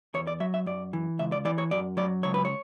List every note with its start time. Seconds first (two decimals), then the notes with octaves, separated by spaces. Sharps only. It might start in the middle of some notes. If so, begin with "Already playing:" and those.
0.14 E2 C#5
0.27 D5
0.40 F#3 E5
0.54 E5
0.66 F#2 D5
0.93 E3
1.19 C#2 E5
1.32 D5
1.45 E3 D5
1.58 C#5
1.71 F#2 D5
1.97 F#3 D5
2.23 C#2 C#5
2.34 B4
2.45 C#5